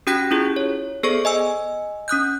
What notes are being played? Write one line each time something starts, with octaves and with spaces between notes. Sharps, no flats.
C#4 F#4 G4 G5 F#6 A#6
C#4 E4 F4 G4 G#4
C#5
B3 G#4 A4 C5 D5 C#6
D#5 G#5 E6
C#4 D#6 F#6 G6